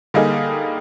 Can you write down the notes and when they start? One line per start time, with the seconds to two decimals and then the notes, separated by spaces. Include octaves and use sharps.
0.14 D3 G3 A#3 D#4 G#4